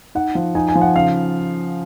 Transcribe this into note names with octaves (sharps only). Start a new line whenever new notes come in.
D#4 F#5
F3
D#4 G#5
G#5
F3
F#5
C#3 F5